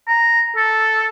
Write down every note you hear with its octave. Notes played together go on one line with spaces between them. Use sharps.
A#5
A4